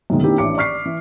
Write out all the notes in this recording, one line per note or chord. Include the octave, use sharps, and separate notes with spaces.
F#2 B2 D#3 G#3
D#3 A#3 C4 D4 E4 G4
A1 E3 D4 D6 C#7
D5 C#6 F6 B6 C7
E3